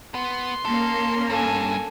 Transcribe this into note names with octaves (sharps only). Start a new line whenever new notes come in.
B3 C6
A#3 C#4 A4
G2 A4 G#5